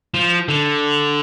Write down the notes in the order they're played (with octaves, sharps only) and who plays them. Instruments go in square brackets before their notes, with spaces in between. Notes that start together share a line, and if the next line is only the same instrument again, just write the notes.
[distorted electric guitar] F3
D3